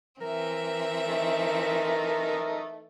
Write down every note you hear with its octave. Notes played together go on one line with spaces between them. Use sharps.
E3 C4 A#4 E5
A3 D#4